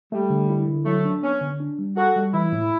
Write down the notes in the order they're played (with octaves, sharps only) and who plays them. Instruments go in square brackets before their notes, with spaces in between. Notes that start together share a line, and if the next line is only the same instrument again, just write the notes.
[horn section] G3 [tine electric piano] A3
[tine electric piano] D3
E4
D3
[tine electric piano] F#3 [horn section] A3
[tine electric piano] D4
[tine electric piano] B3 [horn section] C#4
[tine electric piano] D3
D4
G3
[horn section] F#4 [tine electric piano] A4
[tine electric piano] G3
[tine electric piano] E3 [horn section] E4
[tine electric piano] A2